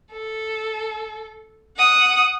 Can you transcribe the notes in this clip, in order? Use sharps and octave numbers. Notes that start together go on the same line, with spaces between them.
A4
F#5 D#6